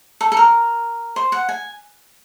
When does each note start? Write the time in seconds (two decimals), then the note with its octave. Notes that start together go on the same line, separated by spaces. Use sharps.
0.21 A4
0.32 A4
0.37 A#4
1.16 C5
1.32 F#5
1.49 G#5